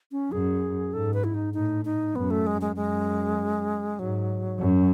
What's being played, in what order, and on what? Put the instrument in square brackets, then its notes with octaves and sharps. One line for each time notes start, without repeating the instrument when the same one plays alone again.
[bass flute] C#4
[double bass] F#2 [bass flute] G#4
[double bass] G#2 [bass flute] A4
[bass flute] B4
E4
D#4
[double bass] A2 [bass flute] D#4
[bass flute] D#4
[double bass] F#2 [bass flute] B3
[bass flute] A3
G#3
G#3
[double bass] F#2 [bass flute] G#3
[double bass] G#2 [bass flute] F#3
[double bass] F#2